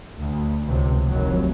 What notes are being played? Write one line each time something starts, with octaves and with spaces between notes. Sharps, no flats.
D2
C#2 C3
F1 D#2 F#3